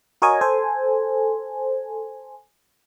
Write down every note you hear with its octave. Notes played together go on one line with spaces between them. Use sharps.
F#4 A#4 C#5 D#5 G#5
A4 C5 G#5